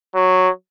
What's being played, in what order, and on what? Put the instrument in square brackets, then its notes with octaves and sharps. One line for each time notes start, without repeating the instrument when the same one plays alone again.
[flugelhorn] F#3